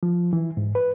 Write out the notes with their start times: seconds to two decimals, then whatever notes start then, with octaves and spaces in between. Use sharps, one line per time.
0.03 F3
0.33 E3
0.57 G#2
0.75 B4